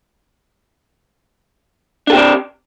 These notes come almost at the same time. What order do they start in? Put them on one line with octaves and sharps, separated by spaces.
D4 A4 G4 C4 D5